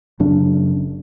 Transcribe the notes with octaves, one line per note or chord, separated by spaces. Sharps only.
F#1 F#2 C#3 D4